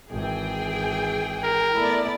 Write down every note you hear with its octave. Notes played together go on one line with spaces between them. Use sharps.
G#1 E3 G#4 G5
A#4
A3 B3 E4 D5